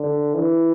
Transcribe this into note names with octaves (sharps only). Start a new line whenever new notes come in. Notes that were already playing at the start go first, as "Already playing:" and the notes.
Already playing: D3
E3